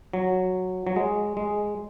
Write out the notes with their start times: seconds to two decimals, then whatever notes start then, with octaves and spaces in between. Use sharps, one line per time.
0.13 F#3
0.87 F#3
0.96 G#3
1.37 G#3